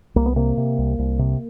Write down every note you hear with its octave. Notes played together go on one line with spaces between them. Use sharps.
C2 A#3
B3
C3 A#3
C3
C2
C2
C3